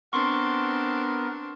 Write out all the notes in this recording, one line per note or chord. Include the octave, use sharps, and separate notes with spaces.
B3 C4 D4 A#4 C6 C#6